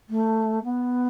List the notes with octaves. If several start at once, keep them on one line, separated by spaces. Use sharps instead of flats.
A3
B3